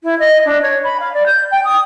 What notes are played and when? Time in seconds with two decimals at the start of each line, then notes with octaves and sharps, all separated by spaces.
0.03 E4
0.19 D#5
0.45 D4
0.62 C#5
0.84 B5
1.00 F5
1.14 D5
1.26 G6
1.51 G5
1.64 D#6